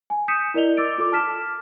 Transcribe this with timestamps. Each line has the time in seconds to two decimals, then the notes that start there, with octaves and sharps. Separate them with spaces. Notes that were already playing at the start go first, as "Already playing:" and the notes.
0.10 G#5
0.28 D#6 G6 B6 C#7 D#7 E7
0.54 E4 A#4 D5 D#5 F7 G7
0.77 D6 E6 A6 D7
0.98 F4 A4 D6
1.12 A5 F6 B6 E7